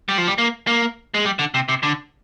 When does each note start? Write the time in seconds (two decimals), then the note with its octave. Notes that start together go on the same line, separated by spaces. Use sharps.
0.09 G3
0.18 F3
0.28 G3
0.38 A#3
0.67 A#3
1.14 G#3
1.25 G3
1.39 D3
1.54 C3
1.69 C3
1.83 D3